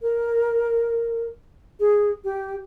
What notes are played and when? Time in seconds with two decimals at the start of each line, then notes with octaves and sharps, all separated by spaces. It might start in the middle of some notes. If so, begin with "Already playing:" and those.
0.02 A#4
1.80 G#4
2.24 G4